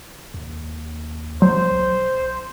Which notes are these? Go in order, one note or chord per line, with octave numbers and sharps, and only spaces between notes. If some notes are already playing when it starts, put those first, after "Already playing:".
D#2
F#3 C5
B1